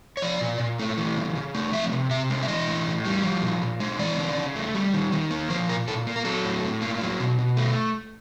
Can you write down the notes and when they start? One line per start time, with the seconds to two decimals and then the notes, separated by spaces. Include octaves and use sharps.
0.17 C#5
0.22 F3 D5
0.41 A#2
0.60 A#2
0.79 A3
0.98 E3
1.16 C#3
1.35 C#3
1.55 A3
1.73 F3 E5
1.92 C3
2.11 C3 E5
2.30 G#3
2.43 E5
2.48 E3 D#5
2.67 A2
2.86 A2
3.05 G3
3.23 F3
3.43 A#2
3.62 A#2
3.80 G#3
3.99 E3 D5
4.18 C#3
4.37 C#3
4.56 A3
4.75 G3
4.93 D#3
5.12 D#3
5.31 A#3
5.50 F3 C5
5.69 A#2 A#4
5.88 A#2 A4
6.07 A#3
6.16 A#4
6.25 F#3 A4
6.45 A2
6.63 A2
6.82 A#3
7.01 F#3
7.20 B2
7.39 B2
7.57 A3